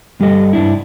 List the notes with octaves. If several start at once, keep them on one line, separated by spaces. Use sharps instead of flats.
G2 G3 G4 A4 D#5
G2 D4 E4